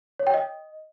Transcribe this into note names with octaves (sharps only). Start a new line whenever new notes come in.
C#5
G5
D#5